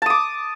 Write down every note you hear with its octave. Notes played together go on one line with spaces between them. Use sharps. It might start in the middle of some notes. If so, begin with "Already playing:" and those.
A5 D6 D#6